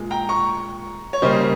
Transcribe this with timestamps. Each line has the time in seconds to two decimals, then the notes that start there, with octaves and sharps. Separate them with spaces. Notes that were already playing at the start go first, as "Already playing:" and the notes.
Already playing: A#2 G#3
0.11 G5 A#5
0.29 A#5 C#6
1.13 C#5
1.22 C#3 G3 A#3 C5 D#5